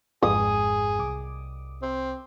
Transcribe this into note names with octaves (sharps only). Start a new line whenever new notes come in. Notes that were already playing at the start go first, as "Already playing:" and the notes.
G#1 F2 G#2 G#4 D#6
C2 D6
C4